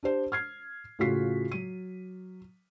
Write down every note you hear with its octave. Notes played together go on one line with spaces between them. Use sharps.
D4 G4 C5
F6 G#6 C7
A2 C#3 F4 F#4 B6 C7
F#3 D#7